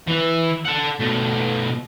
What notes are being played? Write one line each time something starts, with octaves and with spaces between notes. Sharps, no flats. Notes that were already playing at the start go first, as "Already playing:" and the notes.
E3
A4 F#5
B2 A3